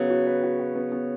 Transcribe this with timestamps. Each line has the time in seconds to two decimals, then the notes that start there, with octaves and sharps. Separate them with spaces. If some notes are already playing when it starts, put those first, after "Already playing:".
Already playing: C#3 F#3 B3
0.10 F#4
0.27 B4
0.43 F#4
0.59 F#4
0.75 B3
0.92 B3